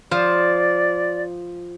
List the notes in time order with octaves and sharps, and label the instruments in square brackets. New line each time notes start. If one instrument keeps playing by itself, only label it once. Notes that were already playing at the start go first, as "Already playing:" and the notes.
[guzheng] F3 C5 [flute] D5